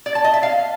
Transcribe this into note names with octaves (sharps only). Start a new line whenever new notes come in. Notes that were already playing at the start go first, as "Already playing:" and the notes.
D5
A5
D#5
E5
F5